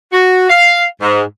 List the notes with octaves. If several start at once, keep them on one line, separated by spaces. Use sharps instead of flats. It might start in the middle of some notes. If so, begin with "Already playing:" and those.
F#4
F5
G#2